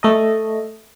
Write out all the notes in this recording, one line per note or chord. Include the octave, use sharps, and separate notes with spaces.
A3 A4 D#5